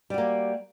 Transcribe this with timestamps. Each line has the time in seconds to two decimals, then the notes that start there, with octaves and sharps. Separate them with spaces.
0.10 G3
0.14 F#4
0.18 A#3